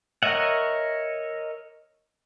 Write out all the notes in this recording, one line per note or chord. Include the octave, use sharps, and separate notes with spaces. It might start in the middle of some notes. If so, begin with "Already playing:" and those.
A#4 C#5 D#5 E5 F#5